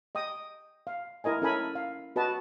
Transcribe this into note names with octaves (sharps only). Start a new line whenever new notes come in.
D#5 G5 D#6
F5
E4 A#4 D#5 G#5
C#4 E4 A4 A#4 G#5 B5
F5
F#4 B4 D#5 A5